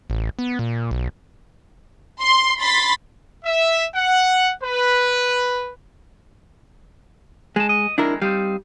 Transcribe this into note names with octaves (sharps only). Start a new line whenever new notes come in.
A1
B3
A#2
B1
C6
B5 C6 A6 B6
E5
F#5
B4
G#3 D#5 A5
D#5
F2 D#3 G#3 D4 E4 A#4
G3 C4 D#4 F5